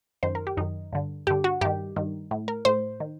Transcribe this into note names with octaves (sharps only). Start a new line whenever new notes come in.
F#2 D#3 C5
A#4
G4
F#2 D#3 D#4
G2 D3
G2 D3 G4
F#4
G2 D#3 G4
G2 D#3
A2
A#4
A2 C5
D#3